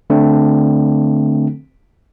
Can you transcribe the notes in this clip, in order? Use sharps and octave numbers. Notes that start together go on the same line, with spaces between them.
D3 A3 C4 D4